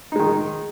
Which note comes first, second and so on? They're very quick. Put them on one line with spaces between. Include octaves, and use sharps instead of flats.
D#4 G#3 D#3